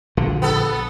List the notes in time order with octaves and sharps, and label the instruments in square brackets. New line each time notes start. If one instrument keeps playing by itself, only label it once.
[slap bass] A#1 D3
[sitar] B3 A4